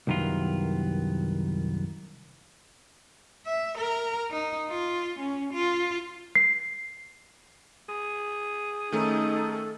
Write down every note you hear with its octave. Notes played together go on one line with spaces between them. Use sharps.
C2 F#2 D#3 B3 F4
E5
A#4
D#4
F4
C#4
F4
C7
G#4
D#3 A3 C#4 D#4 A4